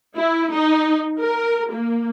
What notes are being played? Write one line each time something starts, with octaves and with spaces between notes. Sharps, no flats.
E4
D#4
A#4
A#3